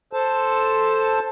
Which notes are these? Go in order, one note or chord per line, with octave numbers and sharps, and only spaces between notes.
A4 C5 A5